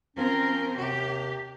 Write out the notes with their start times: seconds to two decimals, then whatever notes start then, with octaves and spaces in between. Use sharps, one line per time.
0.17 F3 C4 C#4 A#4
0.77 D#2 C3 G4